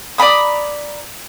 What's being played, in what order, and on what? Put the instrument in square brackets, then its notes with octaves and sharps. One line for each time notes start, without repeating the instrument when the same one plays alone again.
[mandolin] D5 A#5 B5 D#6